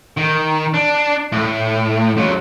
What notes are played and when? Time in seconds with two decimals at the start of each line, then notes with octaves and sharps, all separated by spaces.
0.17 D#3
0.74 D4
1.32 A2
2.17 C#2 F#3